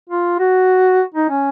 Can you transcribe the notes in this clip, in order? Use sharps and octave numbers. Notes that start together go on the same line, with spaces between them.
F4
F#4
D#4
C#4